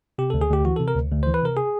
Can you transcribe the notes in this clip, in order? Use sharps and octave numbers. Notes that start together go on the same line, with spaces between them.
C3 G4
D2 A4
G#4
D2 G4
E3 F#4
C3 A4
A#4
D2
D2
E3 C5
B4
C3 A#4
G#4